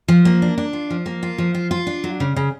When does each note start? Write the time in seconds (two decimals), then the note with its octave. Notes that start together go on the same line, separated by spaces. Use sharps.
0.08 F3
0.25 A#3
0.42 D4
0.58 D4
0.73 F4
0.90 F3
1.06 A#3
1.23 F4
1.38 F3
1.54 F4
1.71 F4
1.87 D4
2.04 F#3
2.20 C#3
2.36 C#3